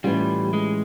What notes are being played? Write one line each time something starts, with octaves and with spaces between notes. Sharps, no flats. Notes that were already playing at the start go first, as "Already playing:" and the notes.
A2 E3 G3 A3 C#4 F4
G#3